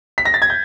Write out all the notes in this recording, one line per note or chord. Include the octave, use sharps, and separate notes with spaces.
B6
A#6
A6
G#6
G6